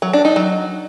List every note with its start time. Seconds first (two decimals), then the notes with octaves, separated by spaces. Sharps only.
0.02 F#3
0.13 D4
0.25 D#4
0.36 F#3